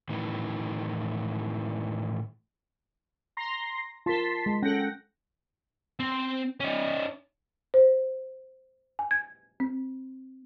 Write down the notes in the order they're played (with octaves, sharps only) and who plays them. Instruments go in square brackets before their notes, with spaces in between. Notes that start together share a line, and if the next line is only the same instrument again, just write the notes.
[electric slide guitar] A2 D#3 E3
[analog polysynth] A#5 C6 A#6
[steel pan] F4 A#4 [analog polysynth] A5 C6 B6
[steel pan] G#3
[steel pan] C#4 A4 [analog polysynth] F#5 G5 A#6
[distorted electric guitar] C4
C#4 D#4
[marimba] C5
G#5
G#6
C4